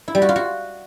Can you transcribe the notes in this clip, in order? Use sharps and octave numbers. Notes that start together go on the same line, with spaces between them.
E4
G3
F#4
F4
F#4